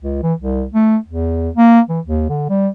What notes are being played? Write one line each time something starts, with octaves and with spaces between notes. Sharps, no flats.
C#2
E3
C2
A3
E2
A#3
E3
D#2
D3
G3